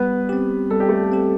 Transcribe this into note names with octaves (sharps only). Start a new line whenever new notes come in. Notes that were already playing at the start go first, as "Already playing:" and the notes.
Already playing: G3 B3 B4
C4 G4
G3 A4
G4
A3 A4
C4 G4